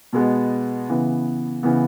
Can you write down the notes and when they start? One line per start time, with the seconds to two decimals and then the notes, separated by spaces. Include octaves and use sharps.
0.13 B2 G#3 B3
0.89 C#3 E3 B3
1.63 C#3 E3 B3